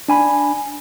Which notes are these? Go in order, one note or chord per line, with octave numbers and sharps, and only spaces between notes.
D4 G#5 B5